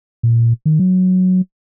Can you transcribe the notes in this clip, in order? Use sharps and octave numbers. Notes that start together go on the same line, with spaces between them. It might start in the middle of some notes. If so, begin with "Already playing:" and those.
A#2
D#3
F#3